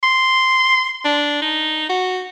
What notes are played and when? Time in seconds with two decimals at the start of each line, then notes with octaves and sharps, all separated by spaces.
0.03 C6
1.05 D4
1.42 D#4
1.89 F#4